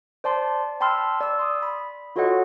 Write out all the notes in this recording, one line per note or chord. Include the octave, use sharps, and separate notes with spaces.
C5 D5 A5 C6
G5 A5 B5 C6 E6 F6
D5 E6
C6 D#6
B5
F4 F#4 A4 C#5 D#5 F#5